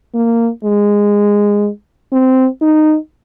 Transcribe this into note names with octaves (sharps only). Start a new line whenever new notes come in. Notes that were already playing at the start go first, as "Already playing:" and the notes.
A#3
G#3
C4
D#4